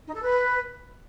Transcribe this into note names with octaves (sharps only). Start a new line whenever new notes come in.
D#4
A4
B4